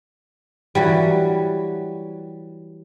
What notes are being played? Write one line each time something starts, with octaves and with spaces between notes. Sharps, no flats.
E3 F#3 G3